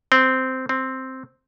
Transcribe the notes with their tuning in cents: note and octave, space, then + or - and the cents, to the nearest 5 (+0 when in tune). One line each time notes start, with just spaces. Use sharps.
C4 -10
C4 +0